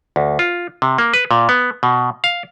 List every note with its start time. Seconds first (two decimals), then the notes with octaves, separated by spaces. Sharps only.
0.16 D2
0.39 F4
0.82 C3
0.98 A#3
1.14 B4
1.31 A#2
1.49 B3
1.83 B2
2.24 F5